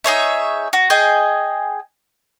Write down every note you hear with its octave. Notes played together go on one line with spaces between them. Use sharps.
D#4 G#4 C#5 E5
F#4
G#4 D#5 G5